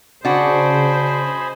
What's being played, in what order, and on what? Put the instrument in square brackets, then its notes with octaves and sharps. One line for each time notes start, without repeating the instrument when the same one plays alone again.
[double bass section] C#3 [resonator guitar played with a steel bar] D4 F#4 [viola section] C5 [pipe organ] D#5 G#5 B5